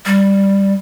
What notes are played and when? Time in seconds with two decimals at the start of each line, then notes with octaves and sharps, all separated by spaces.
0.06 G3